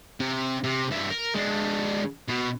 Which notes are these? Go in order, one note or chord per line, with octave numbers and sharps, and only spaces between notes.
C3
C3
G2 E5
A#4
G#3 D4
B2